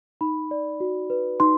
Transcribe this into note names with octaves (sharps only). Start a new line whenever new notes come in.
D#4 B5
D5
F#4
B4
D#4 C6